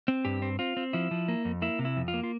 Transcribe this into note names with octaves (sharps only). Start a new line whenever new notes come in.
C4
G2 G4
C4
C4 F4
C4
F3 E4
F3
A#3
F2
A#3 E4
C3
E4
F2
F4
A#3
F4